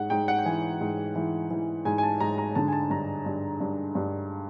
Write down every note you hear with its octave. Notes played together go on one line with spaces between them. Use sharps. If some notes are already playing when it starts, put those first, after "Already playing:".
Already playing: G#2 F#5
G#2 G5
F#5
G5
E3 G#5
G#2
E3
E3
G#2 G#5
G#5
A5
G#2 A#5
A#5
D3 A5
G#5
A5
G2 A#5
G2
G2
G2